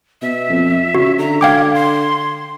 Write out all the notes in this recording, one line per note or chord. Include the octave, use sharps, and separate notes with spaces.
B2 E5
F2
C#3 F#4
D3 A#5
F5 G5 D6 G#6
C6